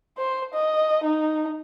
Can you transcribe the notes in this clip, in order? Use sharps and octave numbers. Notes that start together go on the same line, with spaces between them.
C5
D#5
D#4